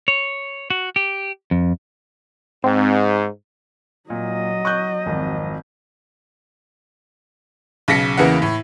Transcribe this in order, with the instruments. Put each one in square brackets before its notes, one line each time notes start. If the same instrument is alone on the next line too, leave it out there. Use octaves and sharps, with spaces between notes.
[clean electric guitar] C#5
F#4
G4
F2
[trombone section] G#2 [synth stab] C4
[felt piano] A#2 [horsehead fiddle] F#3 D#5
[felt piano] C#6 F#6 G6
G#1 F2
[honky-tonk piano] B1 C#3 A#6 B6 C#7
E2 C#3 E3 A#3 F#5
A2